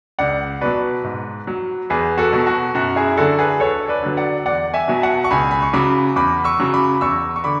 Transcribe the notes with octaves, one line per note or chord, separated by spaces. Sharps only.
C#2 D5 F#5
B2 F#3 B4 D5
G#2
F#3
E2 G#4 B4
F#4 A4
B2 F#3
F#4
F#2 F#4
E4 G#4
D3 F#3 F#4 A4
G#4 B4
D2 A4 C#5
B4 D5
D3 F#3
D5 F#5
E2 D5 F#5
E5 G#5
B2 F#3
F#5 A5
C#6
C#2 G#5 B5
B5
C#6
C#3 F#3 B5 D6
E2 B5 D6
C#6 E6
C#3 F#3
B5 D6
E2 C#6 E6
C#6
D3 B5 D6